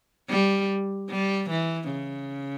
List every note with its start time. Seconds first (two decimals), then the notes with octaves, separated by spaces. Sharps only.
0.29 G3
1.10 G3
1.50 E3
1.91 C#3